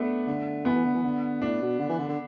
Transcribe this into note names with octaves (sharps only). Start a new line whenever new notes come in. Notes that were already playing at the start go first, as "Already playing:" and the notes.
Already playing: A3 B3 D4
D3
E3 B3
E3
D3
E3
D3
A2 D4
B2
D3
E3
D3
D3